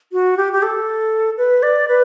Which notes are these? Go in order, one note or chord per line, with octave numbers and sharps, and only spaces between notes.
F#4
G4
G4
A4
B4
D5
B4